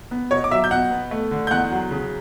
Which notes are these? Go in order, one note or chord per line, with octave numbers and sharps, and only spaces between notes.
B3
B2 C#5 C#6
D6
F#3 E5 E6
G6
B2 F#5 F#6
B3
A3
D3
G6
E2 F#5 F#6
F#3
C#3